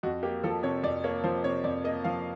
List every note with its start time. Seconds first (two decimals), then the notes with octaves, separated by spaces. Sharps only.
0.03 F2 F#4
0.23 A#3 G4
0.43 F3 A4
0.63 C3 C#5
0.83 F2 D5
1.04 A#3 C#5
1.24 F3 C5
1.44 C3 C#5
1.64 F2 D5
1.84 A#3 D#5
2.04 F3 F5